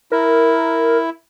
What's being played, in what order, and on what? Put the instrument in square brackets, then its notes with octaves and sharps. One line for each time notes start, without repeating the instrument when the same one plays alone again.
[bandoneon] E4 [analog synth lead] A#4